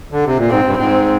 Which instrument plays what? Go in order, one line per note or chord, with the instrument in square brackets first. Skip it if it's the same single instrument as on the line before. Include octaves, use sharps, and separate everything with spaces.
[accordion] D3
C3
A#2
[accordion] G#2 [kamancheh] C4
[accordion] G2
[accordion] G#2 [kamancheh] C4